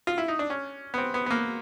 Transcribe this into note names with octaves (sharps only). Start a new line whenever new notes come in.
F4
E4
D#4
D4
C#4
B3
C4
B3
B3
A#3